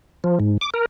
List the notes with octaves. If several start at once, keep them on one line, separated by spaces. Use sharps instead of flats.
F3
G#2
D6
A#4